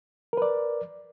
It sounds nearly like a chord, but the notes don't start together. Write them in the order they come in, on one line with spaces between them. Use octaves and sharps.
A#4 B4 D5